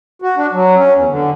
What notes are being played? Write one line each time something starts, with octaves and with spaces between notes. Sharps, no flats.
F#4
D4
F#3
C#4
E2
D3